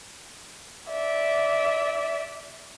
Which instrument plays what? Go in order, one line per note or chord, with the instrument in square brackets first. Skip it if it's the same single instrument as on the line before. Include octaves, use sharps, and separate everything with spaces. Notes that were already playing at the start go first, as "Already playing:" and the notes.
[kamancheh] D5 E5